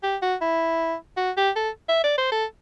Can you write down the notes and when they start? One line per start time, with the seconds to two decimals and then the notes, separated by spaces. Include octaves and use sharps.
0.03 G4
0.22 F#4
0.41 E4
1.17 F#4
1.37 G4
1.56 A4
1.89 E5
2.04 D5
2.18 C5
2.32 A4